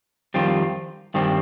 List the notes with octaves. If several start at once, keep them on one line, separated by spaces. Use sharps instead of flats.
F2 D#3 G3 C4 F4
G2 D#3 G3 C4